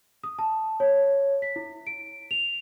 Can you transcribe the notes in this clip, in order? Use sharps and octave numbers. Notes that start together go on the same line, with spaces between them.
D#6
A5
C#5
B6
E4
D7
F7